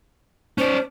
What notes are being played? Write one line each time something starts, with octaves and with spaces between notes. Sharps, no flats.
C#4 C5 D5